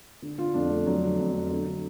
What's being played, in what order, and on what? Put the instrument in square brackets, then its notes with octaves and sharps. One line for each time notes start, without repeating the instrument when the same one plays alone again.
[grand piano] D3
D3 F4
F2 D4
F2 A3
D3 F#3
D3
F2
F2
D3
D3